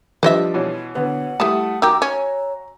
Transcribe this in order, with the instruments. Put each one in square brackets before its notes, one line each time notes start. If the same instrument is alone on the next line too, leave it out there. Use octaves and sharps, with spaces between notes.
[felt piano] F3 G3 D4 [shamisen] B4 D#5 E5
[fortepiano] B2 E3 C#4
[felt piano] D3 B3 [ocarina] F#5
[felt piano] G3 [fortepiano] A3 D#6 [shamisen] E4 A5
[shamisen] D#3 G4 [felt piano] F#4 A#5 [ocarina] D6 [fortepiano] E6
[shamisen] C#4 [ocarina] C#5